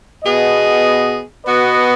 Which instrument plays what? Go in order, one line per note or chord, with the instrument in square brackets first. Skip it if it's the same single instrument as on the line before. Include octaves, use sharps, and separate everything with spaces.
[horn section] B2 B3 G#4 D#5
B2 B3 F#4 B4 D#5